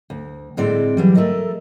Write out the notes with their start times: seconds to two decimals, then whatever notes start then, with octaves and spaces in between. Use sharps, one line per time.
0.10 D2
0.57 A2 D3 G#3 C4 D5
0.97 E3 F#3 G3
1.15 A3 A4 A#4 D#5